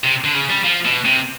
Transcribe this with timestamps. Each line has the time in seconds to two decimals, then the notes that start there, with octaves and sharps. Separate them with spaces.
0.04 C3
0.24 D3
0.34 C#3
0.50 G3
0.64 F3
0.85 B2
1.05 C3